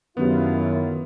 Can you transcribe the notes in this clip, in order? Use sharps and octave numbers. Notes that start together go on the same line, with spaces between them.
F#2 D#3 B3 C#4 E4 F4 G4